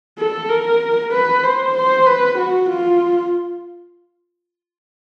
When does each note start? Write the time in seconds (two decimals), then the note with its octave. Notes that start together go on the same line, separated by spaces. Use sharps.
0.18 A4
0.49 A#4
1.12 B4
1.43 C5
1.75 C5
2.06 B4
2.38 F#4
2.70 F4